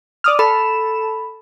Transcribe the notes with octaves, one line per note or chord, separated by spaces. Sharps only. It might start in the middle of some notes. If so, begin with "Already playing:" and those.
D5 D#6 F6
A4 B5 E7